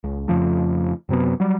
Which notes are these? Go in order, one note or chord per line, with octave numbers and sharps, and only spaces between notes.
C#2
F2 C#3 F3 A3
F#2 C3 F#3 B3
F#3 G3